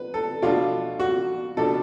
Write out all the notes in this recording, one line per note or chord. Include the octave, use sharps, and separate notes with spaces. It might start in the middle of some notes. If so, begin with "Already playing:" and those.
Already playing: B4
A4
B2 A3 D4 F4
F#4
B2 A3 D4 A4